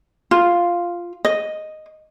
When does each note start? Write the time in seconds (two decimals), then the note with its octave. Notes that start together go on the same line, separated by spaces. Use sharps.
0.31 F4
1.25 D#5